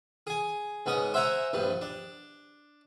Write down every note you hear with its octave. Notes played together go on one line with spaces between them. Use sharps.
G#4 G#5
G#2 B3 C#4 D#6
C5 E5 F#5 G#5 A#5
A#1 G2 B3
D4